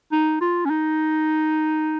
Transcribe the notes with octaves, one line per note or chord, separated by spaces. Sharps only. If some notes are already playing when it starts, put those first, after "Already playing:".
D#4
F4
C#4
D#4